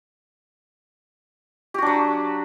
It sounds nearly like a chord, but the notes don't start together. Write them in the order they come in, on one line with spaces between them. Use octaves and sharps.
G4 F#4 D4 F#3